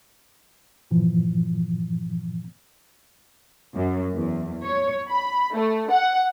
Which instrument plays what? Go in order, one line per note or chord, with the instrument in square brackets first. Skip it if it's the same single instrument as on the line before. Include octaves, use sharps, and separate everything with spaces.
[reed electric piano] G2 A#2 E3 F3
[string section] F#2
E2
C#5
B5
A3
F#5